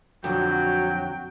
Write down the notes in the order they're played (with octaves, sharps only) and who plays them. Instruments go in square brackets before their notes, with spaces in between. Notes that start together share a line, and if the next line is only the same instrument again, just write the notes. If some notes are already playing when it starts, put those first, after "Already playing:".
[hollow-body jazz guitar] F2 D3 [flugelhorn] F#3 [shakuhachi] F#4 [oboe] G5